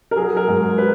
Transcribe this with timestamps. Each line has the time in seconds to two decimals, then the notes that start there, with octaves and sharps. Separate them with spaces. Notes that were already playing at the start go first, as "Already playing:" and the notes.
0.11 A#4
0.16 F#3 G#4
0.37 A#4
0.48 G#2
0.58 G#4
0.78 B4